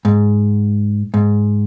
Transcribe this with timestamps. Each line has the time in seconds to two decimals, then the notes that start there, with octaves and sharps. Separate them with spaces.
0.05 G#2
1.14 G#2